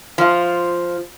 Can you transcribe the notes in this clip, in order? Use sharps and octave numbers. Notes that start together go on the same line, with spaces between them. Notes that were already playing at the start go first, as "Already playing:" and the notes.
F3 F4